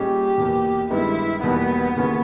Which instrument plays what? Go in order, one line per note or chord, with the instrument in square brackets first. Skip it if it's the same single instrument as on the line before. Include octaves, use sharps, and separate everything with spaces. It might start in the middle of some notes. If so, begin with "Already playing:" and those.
Already playing: [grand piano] A#2 G3 C#4 G#4 D#5 [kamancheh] G4
[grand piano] E2 B2 A#3
[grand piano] G2 D#3 G#3 B3 D#4 [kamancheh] E4
[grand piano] E2 B2 G3 A#3 D#4 [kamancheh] B3
[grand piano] D#2 C#3 E3 A#3 C#4